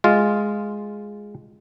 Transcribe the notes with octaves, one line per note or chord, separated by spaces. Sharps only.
G#3 F4